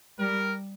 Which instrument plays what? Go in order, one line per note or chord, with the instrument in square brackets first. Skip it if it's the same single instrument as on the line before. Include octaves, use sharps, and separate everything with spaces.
[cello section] G3 [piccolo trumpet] A#4